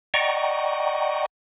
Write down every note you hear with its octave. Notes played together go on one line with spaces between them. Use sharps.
D5 D#5 F#5 G5 A#5 C#6